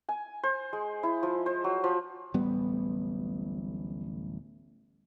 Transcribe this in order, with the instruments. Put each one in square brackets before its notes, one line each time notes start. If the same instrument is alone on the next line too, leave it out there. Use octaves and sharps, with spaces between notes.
[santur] G#5
C5
G#3
E4
F3
C5
F#3
F3
[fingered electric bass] D1 A1 G3 B3